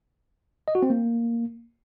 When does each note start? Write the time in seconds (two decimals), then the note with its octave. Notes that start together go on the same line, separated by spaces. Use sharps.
0.68 D#5
0.75 F#4
0.82 C4
0.90 A#3